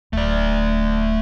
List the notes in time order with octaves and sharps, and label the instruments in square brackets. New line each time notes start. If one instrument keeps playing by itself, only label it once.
[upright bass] D1 [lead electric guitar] A3 D5